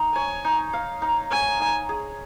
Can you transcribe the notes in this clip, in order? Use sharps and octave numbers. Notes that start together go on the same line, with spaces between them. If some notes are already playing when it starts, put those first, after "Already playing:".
Already playing: D#4
C#5 G#5
D#4
F5
D#4
C#5 G#5
D#4
G#4